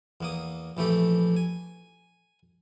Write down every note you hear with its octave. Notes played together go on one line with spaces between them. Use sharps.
E2 A#3 D#6
A#1 E3 A3 G4 A4
G#5